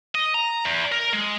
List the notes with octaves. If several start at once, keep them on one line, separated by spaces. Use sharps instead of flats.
D#5
A#5
E2
A#4
G#3